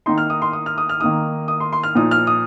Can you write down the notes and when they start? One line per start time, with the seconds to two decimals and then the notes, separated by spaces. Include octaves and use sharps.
0.06 D#3 A#3 D#4 C6
0.18 F6
0.30 D#6
0.42 C6
0.53 D#6
0.66 F6
0.78 D#6
0.89 F6
1.00 D#3 A#3 D#4 D#6
1.48 D#6
1.60 C6
1.72 C6
1.83 F6
1.95 A#2 F3 D#4 D#6
2.11 F6
2.27 D#6